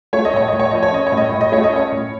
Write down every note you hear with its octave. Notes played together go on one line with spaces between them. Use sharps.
A3 C#5
D#5
A2 C#5
D#5
A2
C#5
F3 D#5
C#5
C#4 D#5
C#5
A2
D#5
A2 C#5
D#5
A3 C#5
D#5
C#4 C#5
A2